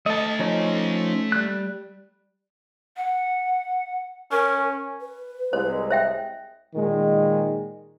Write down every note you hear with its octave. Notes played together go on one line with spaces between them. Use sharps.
A3 D5 D#5 A5
F3 C#4 D#4
G3 F#6
F#5
C#4 A#4
B4
C2 G#3 C5
C5 E5 G5
A#2 D#3 G#3